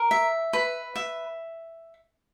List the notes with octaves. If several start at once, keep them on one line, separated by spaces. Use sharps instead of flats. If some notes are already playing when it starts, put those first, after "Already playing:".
Already playing: A#4
E5
B4
E5